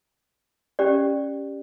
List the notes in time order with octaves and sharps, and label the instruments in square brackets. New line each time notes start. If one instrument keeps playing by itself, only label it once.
[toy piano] C#4 G4 D5